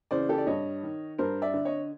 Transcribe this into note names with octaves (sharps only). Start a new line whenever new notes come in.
C#3 E3 C5 D5
G4 A4
D5
G2 C#5 D#5
D#3
G2 A#4 C5
D5 E5
D3
C#5 D#5